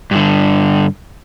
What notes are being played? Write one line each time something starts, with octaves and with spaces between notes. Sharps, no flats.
G2 D3